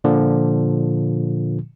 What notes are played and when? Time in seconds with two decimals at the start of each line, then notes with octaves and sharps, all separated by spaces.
0.04 A#2 D3 F3